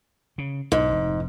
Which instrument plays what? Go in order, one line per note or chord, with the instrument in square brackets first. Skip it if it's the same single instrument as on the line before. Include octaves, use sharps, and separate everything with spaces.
[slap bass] C#3
[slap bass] B1 [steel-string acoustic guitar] G#2
[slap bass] F1